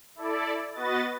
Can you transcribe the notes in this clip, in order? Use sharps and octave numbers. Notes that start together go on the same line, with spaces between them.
E4 A4 D5
B3 F#4 B4 D#5 A6